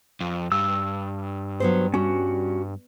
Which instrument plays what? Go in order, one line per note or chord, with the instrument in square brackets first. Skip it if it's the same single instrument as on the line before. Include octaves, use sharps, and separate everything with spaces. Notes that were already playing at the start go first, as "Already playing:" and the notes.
[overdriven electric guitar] F2
[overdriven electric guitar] G2 [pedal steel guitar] E6
[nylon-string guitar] F#3 B3 C5
[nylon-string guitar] G3 [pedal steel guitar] C#4 F#4